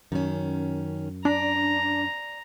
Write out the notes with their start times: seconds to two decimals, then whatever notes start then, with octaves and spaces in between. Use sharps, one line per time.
0.12 F#2 D#3 C#4
1.25 D4 D5 A#5